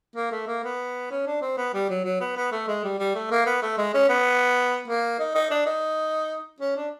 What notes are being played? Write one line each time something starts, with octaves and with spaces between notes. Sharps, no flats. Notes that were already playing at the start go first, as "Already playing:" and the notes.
A#3
A3
A#3
B3
C#4
D4
C4
B3
G3
F#3
F#3
B3
B3
A3
G#3
G3
G3
A3
A#3
B3
A3
G#3
C#4
B3
A#3
D#4
D#4
D4
D#4
C#4
D4